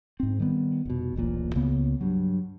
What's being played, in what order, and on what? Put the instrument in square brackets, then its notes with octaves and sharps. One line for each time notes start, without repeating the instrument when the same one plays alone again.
[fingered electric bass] G#2 C4
D#3 G3 B3
F1 B2
D1 A1 A#2
C#2 C#3 A#3 B3
G2 F#3